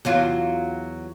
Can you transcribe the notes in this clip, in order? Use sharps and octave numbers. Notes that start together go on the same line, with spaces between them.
E2 F#3 F4